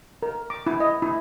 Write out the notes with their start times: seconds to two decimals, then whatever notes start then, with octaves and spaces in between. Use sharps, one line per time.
0.22 A#4
0.50 D6
0.67 E4
0.80 D#5
1.02 E4